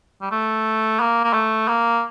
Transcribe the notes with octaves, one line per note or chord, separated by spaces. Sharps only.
G3
A3
A#3
A#3
A3
A#3